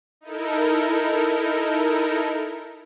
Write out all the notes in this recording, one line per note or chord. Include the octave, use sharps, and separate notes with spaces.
D#4 E4 A4 A#4